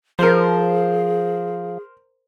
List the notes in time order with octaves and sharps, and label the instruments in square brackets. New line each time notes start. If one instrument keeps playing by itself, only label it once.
[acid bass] F3 [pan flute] G#4 [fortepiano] A#4 C5